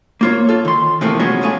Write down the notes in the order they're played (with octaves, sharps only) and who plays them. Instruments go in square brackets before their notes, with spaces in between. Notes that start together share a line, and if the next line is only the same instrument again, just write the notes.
[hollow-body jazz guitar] A#3 F4 C#5
F4 A4
D#3 C6
C3 E3 F3 A3 A#3
F#3 G#3 B3 C#4 F4 F#4
B1 F2 A3 G#4 F5